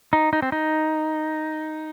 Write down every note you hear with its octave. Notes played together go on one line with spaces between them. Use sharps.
D#4
D#4
C4
D#4